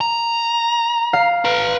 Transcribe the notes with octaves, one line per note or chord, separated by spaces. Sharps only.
A#5
F5
B4 A#5